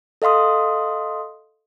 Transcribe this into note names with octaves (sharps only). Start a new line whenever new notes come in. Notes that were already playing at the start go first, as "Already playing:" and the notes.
A4 D#5 F5 C6 D#6